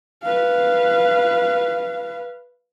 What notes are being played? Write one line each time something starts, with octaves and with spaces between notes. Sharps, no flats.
B4 F5